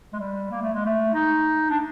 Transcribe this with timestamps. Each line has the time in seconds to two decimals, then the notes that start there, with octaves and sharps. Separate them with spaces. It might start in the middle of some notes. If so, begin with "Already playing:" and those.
0.13 G#3
0.19 G3
0.51 A#3
0.62 A3
0.74 G#3
0.86 A3
1.14 D#4
1.70 D4